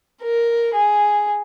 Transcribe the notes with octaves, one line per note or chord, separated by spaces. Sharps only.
A#4
G#4